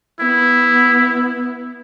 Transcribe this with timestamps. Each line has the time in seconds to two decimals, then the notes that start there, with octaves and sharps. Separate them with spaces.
0.20 B3 E4